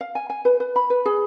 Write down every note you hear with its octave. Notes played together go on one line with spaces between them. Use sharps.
F5
G#5
G#5
B4
B4
B5
B4
G#4